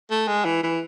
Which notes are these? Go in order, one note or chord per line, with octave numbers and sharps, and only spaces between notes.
A3
G#3
E3
E3